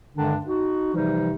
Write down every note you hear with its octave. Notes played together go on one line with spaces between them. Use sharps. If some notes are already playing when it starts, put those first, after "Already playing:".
G2 D3 D#3 G#3 D4
D#4 F#4
C3 E3 F3 G3 D#4